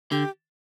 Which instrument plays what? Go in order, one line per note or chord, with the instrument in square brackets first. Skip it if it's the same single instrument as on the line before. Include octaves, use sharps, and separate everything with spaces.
[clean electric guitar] D3 [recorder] G4